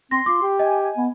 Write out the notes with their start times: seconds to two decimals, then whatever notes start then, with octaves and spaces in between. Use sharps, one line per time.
0.11 C4 C6 A#6
0.26 F4 D6
0.42 G4
0.59 D#5 G#5
0.97 B3